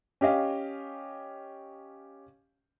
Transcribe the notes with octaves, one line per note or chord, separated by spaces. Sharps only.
C#4 G4 D#5 F5